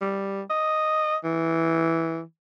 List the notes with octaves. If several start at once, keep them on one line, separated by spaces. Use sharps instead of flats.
G3
D#5
E3